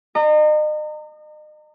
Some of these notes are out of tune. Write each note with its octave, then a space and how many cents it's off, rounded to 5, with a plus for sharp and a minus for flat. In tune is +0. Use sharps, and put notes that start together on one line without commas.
D#5 -35 A#5 -35